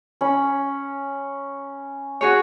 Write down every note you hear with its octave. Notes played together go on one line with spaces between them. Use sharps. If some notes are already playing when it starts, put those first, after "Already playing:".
C#4 B5
F#4 G#4 C#5